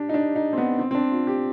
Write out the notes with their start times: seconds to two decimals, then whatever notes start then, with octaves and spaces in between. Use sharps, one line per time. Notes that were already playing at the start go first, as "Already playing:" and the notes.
Already playing: D4 G4
0.09 D#4
0.14 D4
0.36 D#4
0.53 C4
0.58 B3
0.79 C4
0.91 C4
0.95 D4
1.11 F4
1.27 G4